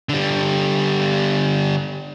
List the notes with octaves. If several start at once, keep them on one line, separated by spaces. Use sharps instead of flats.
D3 G3